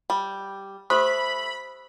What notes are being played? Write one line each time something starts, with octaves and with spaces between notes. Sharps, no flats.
G3
A3 G4 C5 B5 D#6